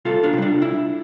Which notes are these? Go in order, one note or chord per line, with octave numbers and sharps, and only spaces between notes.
C2 F4 A4
D4 F4
C3
G3 D4
C2 E4